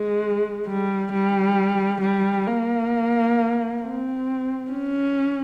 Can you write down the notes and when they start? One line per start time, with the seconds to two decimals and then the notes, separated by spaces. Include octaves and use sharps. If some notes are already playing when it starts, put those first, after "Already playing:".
Already playing: G#3
0.67 G3
1.13 G3
2.02 G3
2.47 A#3
3.82 C4
4.71 C#4